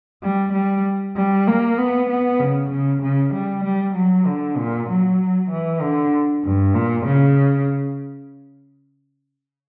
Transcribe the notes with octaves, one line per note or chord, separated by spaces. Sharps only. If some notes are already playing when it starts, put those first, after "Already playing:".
G3
G3
G3
A#3
B3
B3
C#3
C#3
C#3
G3
G3
F#3
D3
A#2
F#3
E3
D3
G2
A#2
C#3